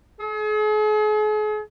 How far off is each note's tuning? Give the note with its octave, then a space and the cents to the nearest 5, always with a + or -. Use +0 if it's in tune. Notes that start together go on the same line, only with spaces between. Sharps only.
G#4 +40